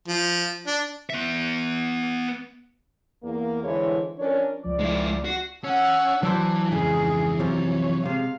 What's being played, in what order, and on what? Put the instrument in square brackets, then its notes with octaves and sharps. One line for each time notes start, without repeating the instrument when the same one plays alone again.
[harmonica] F3
D4
[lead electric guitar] B3 E5
[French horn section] E2 A#3
D3 E3 G#3 E4 C5 C#5
F3 C#4 D4 A#4 C#5
[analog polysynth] C#2 F3 D5
[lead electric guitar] G#3 E4
[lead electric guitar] F#4 [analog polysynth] C7
[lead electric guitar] C#4 [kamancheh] F#5 E6
[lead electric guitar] E3 [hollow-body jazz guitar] F#3 C5 [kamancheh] D4
[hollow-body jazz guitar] F2 G#2 C#3 [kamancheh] G#4
[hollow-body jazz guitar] F#2 C3 F3 [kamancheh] C#5
[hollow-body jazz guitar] C3 G#3 [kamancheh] F5